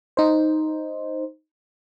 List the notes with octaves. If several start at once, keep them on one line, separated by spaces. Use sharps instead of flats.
D#4 C5